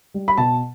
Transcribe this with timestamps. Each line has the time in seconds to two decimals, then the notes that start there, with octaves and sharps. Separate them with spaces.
0.14 G3
0.28 B5
0.38 B2 A5